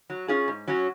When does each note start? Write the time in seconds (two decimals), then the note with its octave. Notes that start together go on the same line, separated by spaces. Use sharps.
0.10 F#3
0.28 C#4 F4 G#4
0.48 G#2
0.68 F#3 C#4 F#4